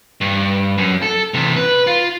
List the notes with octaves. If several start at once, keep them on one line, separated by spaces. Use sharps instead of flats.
G2
F#2
A4
C3 E3
B4
F4